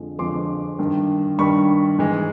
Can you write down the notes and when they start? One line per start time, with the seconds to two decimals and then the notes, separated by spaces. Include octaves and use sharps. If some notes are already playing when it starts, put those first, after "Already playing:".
Already playing: F2 D3 F3 G#3
0.19 F2 D3 F3 G#3 C6 D6
0.79 G2 D#3 G3
1.39 G2 D#3 G3 B5 C#6
1.98 G#2 E3 G#3